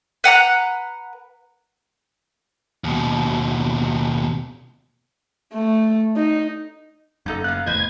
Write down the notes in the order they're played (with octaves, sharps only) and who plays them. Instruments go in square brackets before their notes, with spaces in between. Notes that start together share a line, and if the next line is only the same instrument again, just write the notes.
[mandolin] B4 F#5 A#5 F#6
[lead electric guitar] D#2 B2
[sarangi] A3
D#4
[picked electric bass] F#1 F#2 [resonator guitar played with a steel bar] A#3 D#4 A4
[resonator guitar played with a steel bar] A#3 B3 F5 [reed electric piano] F#6
[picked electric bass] F1 E2 A2 [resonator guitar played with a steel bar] B4 C5 D#5 [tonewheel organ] G#6